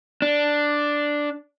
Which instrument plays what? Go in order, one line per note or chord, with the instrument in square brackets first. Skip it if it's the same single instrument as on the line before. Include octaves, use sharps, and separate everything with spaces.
[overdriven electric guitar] D4